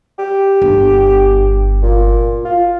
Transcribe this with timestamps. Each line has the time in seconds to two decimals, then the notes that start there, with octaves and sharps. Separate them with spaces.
0.19 G4
0.62 G1
1.83 A#2
2.45 F4